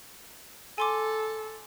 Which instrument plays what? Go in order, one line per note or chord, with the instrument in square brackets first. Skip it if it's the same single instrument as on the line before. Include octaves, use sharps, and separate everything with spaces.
[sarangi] A4 [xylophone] G#5 C6 D6